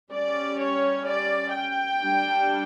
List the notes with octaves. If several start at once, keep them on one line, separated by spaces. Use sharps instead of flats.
G3 C#4 D5
C#5
D5
G5
G3 D4